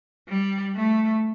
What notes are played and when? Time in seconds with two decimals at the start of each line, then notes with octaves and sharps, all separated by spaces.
0.29 G3
0.75 A3